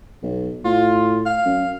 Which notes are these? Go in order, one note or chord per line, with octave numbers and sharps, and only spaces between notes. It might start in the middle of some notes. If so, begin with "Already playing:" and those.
B1
A2 F4
F5
F#2